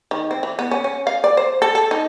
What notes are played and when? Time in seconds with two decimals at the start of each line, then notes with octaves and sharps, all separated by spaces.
0.11 D#3
0.31 C4
0.43 E3
0.59 B3
0.71 C#4
0.84 C#4
1.07 F5
1.24 D5
1.37 C5
1.62 A4
1.75 A4
1.91 D#4